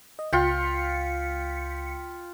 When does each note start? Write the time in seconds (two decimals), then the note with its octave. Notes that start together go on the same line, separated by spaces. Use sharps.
0.19 D#5
0.33 C#2 F4 G5 B6 C#7